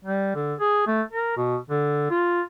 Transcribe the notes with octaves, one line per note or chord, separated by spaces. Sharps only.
G3
D3
G#4
A3
A#4
B2
D3
F4